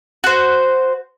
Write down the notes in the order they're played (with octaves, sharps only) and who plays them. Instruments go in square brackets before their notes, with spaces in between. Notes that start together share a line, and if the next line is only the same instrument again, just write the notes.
[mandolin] F#4 C5